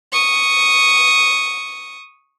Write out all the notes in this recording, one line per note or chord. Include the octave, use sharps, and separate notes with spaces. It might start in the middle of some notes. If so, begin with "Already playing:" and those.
C#6 D#6